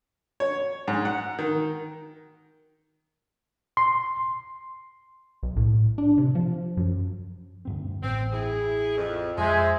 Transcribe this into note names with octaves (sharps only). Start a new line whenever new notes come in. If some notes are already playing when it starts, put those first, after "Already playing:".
C#5
G#2
F#5
D#3
C6
B1
A2
D4
C3
F3
F#2
D2 G2 C4
A1 C4
E4 G#4
F2
F2 G#3 C5 E5 G#5